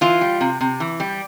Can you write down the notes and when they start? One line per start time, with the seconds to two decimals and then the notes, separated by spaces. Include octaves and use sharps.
0.01 E3 F4
0.21 G3
0.41 C3
0.61 C3
0.80 E3
1.00 G3